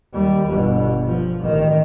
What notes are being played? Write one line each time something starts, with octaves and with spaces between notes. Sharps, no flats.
D#2 G3
G1 B2
F3
A1 D#3